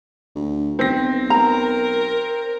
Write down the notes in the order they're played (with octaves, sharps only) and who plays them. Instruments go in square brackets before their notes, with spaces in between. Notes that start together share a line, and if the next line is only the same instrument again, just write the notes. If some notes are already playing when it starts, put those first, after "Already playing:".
[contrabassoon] D2
[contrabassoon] B1 [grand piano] C4 A#6
[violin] A#4 [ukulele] A#5